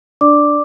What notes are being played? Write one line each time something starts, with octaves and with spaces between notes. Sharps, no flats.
D4 D5 D6